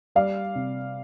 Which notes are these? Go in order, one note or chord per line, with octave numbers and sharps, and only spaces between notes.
G3 D5 F5
C3